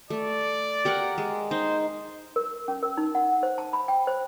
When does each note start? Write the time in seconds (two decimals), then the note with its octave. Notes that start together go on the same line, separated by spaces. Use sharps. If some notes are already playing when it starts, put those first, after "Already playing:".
0.10 A3 D5
0.85 G4 A#4 F#5
1.18 G#3
1.51 D#4 C5
2.36 A#4
2.68 C#4
2.83 A#4
2.97 D#4
3.15 F#5
3.43 C5
3.58 A5
3.73 B5
3.88 G5
4.07 C5